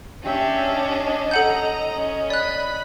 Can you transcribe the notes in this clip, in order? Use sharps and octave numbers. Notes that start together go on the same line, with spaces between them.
C#4 D4 G4 E5
D#5
A4 F#5 A#5 G6
C#4
D5 B5 F#6